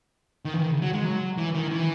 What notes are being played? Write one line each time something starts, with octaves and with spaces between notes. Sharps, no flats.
D#3
E3
D#3
C#3
F#3
G#3
F#3
E3
D#3
E3